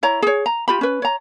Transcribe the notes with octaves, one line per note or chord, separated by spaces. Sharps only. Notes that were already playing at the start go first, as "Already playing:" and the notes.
E4 C#5 A#5
G#4 C#5
A#5
F4 G4 B5
C#4 B4
C#5 A#5